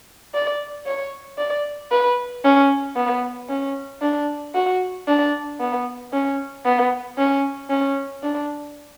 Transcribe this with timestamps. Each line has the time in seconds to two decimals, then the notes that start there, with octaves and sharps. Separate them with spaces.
0.34 D5
0.86 C#5
1.38 D5
1.91 B4
2.44 C#4
2.96 B3
3.49 C#4
4.02 D4
4.55 F#4
5.08 D4
5.60 B3
6.13 C#4
6.66 B3
7.18 C#4
7.70 C#4
8.23 D4